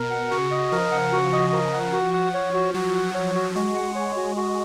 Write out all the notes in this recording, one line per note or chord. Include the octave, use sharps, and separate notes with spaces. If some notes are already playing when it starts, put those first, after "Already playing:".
Already playing: B2 A#4
F#5
C#3 F#4
D#5
F3 A#4
F#5
F#4
D#5
A#4
F#5
F#4
F#5
C#5
F#4
F#3 F#4
F#5
C#5
F#4
G#3 F#4
F#5
C#5
F#4
F#4